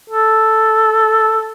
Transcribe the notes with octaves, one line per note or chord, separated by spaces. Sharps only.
A4